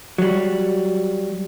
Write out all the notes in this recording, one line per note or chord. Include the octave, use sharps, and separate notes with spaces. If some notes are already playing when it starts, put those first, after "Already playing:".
F#3 G3